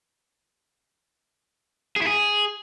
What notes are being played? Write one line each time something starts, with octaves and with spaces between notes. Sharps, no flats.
G#4
E4
G#4